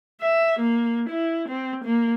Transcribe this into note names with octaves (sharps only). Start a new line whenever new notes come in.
E5
A#3
E4
C4
A#3